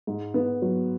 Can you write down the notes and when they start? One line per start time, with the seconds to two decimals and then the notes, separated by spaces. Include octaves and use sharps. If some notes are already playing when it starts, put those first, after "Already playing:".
0.07 G#2
0.34 B3
0.62 F#3